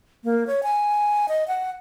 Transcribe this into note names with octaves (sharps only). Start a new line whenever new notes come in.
A#3
C#5
G#5
D#5
F#5